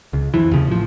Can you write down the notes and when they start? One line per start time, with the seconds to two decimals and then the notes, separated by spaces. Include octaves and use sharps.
0.13 C#2
0.34 F2 E3
0.51 D#2 C#3 F3
0.67 A1 F3